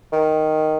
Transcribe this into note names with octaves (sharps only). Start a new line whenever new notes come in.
D#3